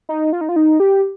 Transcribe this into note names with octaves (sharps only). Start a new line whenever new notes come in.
D#4
F4
D#4
F4
D#4
G4